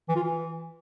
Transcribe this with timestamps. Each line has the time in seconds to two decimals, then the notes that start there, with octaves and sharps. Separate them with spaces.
0.08 E3
0.16 F4
0.23 E3